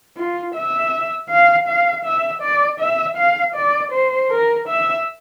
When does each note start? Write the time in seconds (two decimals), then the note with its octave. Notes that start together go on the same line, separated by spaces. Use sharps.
0.17 F4
0.55 E5
1.30 F5
1.67 F5
2.05 E5
2.42 D5
2.80 E5
3.17 F5
3.55 D5
3.92 C5
4.30 A#4
4.68 E5